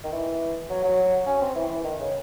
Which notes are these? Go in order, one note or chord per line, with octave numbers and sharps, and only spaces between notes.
D#3
E3
F#3
F#3
C#4
C4
E3
E3
D#3
C#3